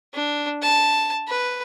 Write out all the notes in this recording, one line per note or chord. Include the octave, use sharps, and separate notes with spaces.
D4
A5
B4